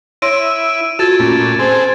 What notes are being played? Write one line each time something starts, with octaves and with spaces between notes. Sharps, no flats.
E4 C#5 C6 D7 D#7
F4 F#4 A4 G#6 A6 E7
A#2 A3 C#4
C4 G#4 A4 C5